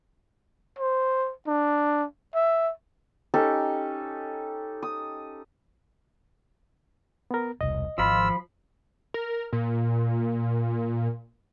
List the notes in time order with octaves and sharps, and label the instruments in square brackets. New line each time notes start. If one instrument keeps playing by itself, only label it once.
[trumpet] C5
D4
E5
[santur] C#4 D#4 G4 A4
D#6
[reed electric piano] B3 A#4
[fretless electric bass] E1 C2 [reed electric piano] D#5
[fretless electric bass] G#1 [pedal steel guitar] F3 B5 [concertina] F4 E6
[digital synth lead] A#4
A#2